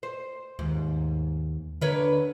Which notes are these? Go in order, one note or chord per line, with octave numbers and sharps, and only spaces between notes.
C5
D#2 G#2
D3 A#4 B4 C#5